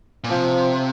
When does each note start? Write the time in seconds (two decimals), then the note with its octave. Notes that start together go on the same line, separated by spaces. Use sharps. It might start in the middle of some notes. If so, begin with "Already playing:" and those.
0.24 A#2
0.30 C3 F3